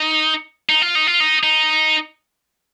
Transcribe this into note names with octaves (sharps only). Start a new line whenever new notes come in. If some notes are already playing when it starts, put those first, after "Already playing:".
Already playing: D#4
D#4
F4
D#4
F4
D#4
D#4